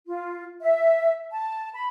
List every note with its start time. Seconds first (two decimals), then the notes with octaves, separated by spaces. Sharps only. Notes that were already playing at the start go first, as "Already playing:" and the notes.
0.07 F4
0.61 E5
1.31 A5
1.75 B5